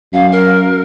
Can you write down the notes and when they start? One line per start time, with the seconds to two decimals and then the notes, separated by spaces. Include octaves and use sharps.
0.13 F#2 F5
0.32 A#4